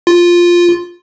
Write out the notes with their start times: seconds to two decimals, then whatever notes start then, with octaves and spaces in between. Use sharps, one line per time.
0.07 F4